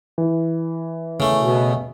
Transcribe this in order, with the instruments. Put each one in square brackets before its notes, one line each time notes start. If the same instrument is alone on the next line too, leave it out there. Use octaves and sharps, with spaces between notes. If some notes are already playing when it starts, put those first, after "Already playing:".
[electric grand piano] E3
[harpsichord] C#3 A3
[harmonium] B2